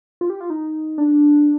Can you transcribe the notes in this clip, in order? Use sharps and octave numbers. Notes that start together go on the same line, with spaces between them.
F4
G4
F4
D#4
D4